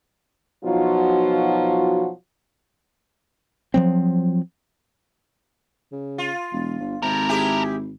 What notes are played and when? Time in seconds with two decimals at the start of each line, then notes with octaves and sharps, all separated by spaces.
0.64 B2 F3 F#3 D#4 F4 F#4
3.74 F3 F#3 C4
5.92 C#3
6.18 F4
6.53 E1
6.80 G1
7.02 G#1 C3 A4 A#4
7.29 E4 G4 G#4